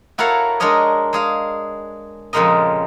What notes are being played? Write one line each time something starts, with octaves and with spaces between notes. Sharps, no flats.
E4 F#4 A4 A#4 C#5 F5
G#3 D4 A#4 C#5 D#5
G#3 G#4 F5
F2 A#2 C#3 G#3 A#4 D#5